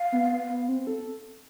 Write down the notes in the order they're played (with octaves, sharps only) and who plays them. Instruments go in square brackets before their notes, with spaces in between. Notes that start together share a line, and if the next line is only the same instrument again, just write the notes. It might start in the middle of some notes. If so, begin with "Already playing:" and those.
Already playing: [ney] F5
[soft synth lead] B3
B3
B3
C4
A4